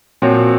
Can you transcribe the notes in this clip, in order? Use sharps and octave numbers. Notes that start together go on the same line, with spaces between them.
A#2 F3 C4 F#4 C#5